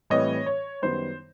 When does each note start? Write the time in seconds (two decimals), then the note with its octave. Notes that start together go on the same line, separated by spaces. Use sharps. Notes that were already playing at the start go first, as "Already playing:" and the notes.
0.10 A2 E3 G3 C4 C#5 D#5
0.46 C#5
0.82 F#2 D#3 G3 B3 C5